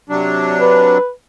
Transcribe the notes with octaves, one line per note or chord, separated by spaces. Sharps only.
C3 F#3 D4
B4